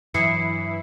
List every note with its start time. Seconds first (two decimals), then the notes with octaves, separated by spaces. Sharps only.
0.14 G2 E3 F#3 E4 D#6 C7 C#7